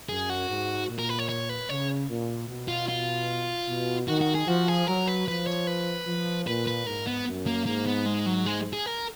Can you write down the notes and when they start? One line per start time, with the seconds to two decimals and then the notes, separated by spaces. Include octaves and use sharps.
0.09 F#2 G#4
0.30 F#4
0.49 G#2
0.88 A#2
0.99 A#4
1.09 B4
1.19 C#5
1.29 C#5
1.49 B4
1.69 C#3 C#5
2.09 A#2
2.49 B2
2.68 F4
2.88 F4
3.67 B2
4.08 D#3 F#4
4.21 F#4
4.35 G#4
4.47 F3 F#4
4.68 G#4
4.87 F#3 A#4
5.07 B4
5.27 F3 B4
5.47 C#5
5.67 B4
6.06 F3
6.47 A#2 B4
6.67 B4
6.87 G#2 A#4
7.07 B3
7.27 F#2
7.47 A#3
7.66 G#2 A#3
7.86 B3
8.06 G#3
8.26 F#3
8.46 G#3
8.73 G#4
8.86 A#4